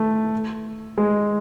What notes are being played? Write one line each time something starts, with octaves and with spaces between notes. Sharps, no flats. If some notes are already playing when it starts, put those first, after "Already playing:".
Already playing: A3
G#3